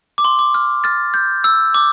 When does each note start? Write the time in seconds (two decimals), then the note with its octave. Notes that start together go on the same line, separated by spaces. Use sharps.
0.18 D6
0.25 C6
0.39 D6
0.54 F6
0.84 F6 A6
1.14 G6
1.44 E6
1.74 D6